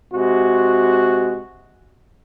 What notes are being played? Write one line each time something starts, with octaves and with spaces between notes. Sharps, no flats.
C3 G#3 F#4